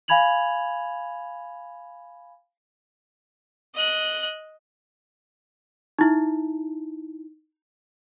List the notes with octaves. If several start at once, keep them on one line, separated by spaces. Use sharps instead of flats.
F5 G#5 B5 G#6 F7 F#7
D#5 F#6
D#4 E4